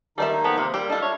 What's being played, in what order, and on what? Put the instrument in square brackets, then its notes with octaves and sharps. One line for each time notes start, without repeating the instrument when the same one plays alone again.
[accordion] D#3 A#3 D#4 [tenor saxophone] G3 [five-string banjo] A4 D5 E5
[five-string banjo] F3 A4 G5 [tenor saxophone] B3
[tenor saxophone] C3 [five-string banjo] A#3
[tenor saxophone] G3 [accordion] A#3 [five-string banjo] G4
[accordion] D4 A4 A5 [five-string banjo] F4 D#5
[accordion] D4 E4 [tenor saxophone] C#5